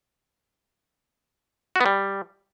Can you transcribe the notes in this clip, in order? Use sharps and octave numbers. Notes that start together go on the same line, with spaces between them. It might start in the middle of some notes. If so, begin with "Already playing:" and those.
F#4
B3
G3